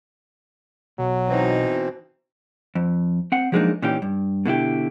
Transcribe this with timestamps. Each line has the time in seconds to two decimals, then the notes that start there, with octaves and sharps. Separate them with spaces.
0.99 B1 F#3
1.28 B2 E3 C4 D#4
2.75 F2
3.32 C4 F#5
3.52 F3 F#3 G#3 A#3 D4 D#4
3.82 A#2 E3 C#4 D#4 G4
4.02 G2
4.45 B2 D3 E4 G4